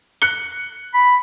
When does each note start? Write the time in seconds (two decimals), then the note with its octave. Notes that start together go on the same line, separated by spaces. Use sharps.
0.22 F#6 C#7 G7
0.94 B5